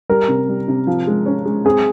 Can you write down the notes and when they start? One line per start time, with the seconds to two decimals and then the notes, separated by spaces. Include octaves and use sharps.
0.09 G3 A#4
0.28 C3
0.48 G3
0.68 C3
0.87 F3
1.07 G#3
1.26 C#4
1.46 G#3
1.65 C4 G#4